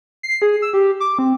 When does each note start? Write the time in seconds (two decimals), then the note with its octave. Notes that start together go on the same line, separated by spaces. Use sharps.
0.23 C7
0.42 G#4
0.62 E6
0.73 G4
1.00 D6
1.19 C4